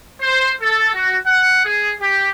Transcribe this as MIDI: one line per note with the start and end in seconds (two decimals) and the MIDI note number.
0.21 0.51 72
0.60 0.92 69
0.93 1.15 66
1.26 1.60 78
1.65 1.91 68
2.00 2.27 67